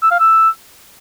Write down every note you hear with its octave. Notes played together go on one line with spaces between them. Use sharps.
E6
F5
E6